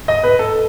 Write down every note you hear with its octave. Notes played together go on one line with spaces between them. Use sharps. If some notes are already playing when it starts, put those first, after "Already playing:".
D#5
B4
A4